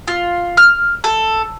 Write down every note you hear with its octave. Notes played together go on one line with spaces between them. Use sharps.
F4
F6
A4